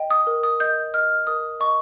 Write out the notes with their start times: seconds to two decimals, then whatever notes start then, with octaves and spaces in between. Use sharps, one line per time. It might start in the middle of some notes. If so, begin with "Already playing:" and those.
Already playing: D#5 G5
0.10 D#6
0.27 A#4
0.43 D#6
0.60 D#5 G6
0.94 D#5 F6
1.27 A#4 D#6
1.60 D#5 C#6